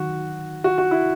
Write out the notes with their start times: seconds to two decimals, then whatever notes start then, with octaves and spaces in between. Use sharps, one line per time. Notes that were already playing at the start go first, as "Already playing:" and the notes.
Already playing: D#3 F#3 F#4
0.64 F#4
0.78 F#4
0.91 E4